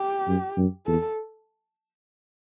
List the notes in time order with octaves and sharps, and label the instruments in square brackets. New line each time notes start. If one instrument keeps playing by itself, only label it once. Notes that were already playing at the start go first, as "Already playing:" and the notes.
Already playing: [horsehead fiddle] G4
[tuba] F#2
F#2
[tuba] E2 [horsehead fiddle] A4